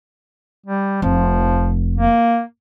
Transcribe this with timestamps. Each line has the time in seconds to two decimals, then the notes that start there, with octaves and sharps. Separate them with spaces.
0.66 G3
1.02 F1 F3
1.96 A#3